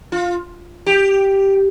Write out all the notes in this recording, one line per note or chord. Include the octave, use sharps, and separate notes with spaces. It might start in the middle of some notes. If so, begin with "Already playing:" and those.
F4
G4